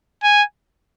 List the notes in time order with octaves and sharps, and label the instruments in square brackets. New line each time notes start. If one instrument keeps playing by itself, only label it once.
[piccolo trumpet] G#5